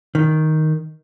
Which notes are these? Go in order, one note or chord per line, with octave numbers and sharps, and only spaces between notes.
D#3